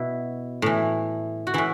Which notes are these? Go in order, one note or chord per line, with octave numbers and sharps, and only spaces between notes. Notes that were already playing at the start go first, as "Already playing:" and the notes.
Already playing: B2 E4
A2 E3
F#4
A2 E3 E4